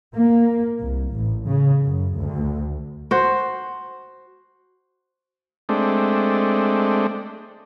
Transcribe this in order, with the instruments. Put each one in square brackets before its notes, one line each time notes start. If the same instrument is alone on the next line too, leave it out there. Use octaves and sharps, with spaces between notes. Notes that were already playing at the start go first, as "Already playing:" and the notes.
[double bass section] A#3
C2
A1
C#3
F#2
D2
[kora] F#4 C5
[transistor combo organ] G#3 A3 C4 D4